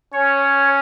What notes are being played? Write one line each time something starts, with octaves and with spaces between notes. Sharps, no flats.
C#4 C#5